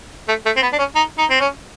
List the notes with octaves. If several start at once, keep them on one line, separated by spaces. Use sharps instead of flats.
A3
A3
C4
B3
D4
C#4
D#4
D#4
C4
C#4